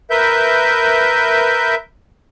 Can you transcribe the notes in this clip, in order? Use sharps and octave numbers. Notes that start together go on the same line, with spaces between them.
A#4 B4 E5 G6